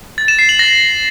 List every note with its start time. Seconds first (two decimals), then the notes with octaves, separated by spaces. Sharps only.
0.18 A6
0.28 E7
0.39 C7
0.49 F#7
0.59 A#6